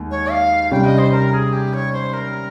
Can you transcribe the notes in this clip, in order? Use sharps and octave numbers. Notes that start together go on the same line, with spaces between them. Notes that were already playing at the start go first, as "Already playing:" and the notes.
Already playing: D#2 G#3
C#5
F5
C3 G3 C#4 G5
D#5
C5
A#4
G#4
G4
C#5
C5
A#4